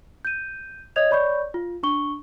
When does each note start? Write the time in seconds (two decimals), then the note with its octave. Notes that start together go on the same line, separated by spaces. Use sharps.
0.25 G6 D#7
0.96 C#5 D#5 D#6 G#6 F7
1.10 C#5 D5 B5 C#6 G6
1.54 F4
1.83 D4 C#6 G7